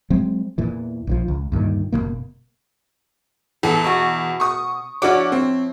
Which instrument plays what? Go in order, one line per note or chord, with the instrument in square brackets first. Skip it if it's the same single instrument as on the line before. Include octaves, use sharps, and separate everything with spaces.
[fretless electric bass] F#3 G#3 C4
E2 A#2 E3
A#1 D3 F3
C#2
D2 G2 A#2 D#3
F#1 G2 B2 A#3
[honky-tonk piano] E2 [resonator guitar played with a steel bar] B3 A4
[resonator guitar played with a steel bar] B2 F#4
[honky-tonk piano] C#6 D#6
[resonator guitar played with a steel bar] F3 E4 C#5 [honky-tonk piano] D4 F#4 D6
[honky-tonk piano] C4